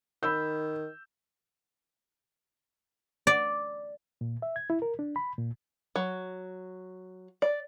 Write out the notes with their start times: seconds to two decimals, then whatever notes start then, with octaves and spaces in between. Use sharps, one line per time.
0.23 D#3 B5 E6 G6
3.27 D5
4.21 A#2
4.42 E5
4.56 G#6
4.70 E4
4.82 A#4
4.99 D4
5.16 B5
5.38 A#2
5.96 F#3
7.42 D5